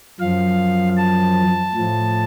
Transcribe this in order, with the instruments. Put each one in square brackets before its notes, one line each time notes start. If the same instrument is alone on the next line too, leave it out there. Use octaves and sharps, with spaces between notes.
[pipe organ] F#2 F3 F5
A5
A2 F3